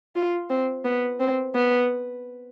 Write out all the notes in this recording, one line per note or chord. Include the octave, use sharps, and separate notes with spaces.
F4
C4
B3
C4
B3